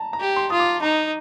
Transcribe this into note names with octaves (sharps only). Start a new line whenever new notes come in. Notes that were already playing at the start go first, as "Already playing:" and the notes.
Already playing: A5 A#5
A#5
G4
C6
F4 D#6
D6
D#4 A#5